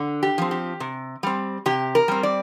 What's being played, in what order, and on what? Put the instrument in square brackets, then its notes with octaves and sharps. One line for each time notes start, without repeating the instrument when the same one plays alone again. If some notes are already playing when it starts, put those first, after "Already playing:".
Already playing: [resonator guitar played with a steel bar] D3
G4
F3 C4
G4
C3
G3 C4
C3 G4
A#4
G3 C4
D5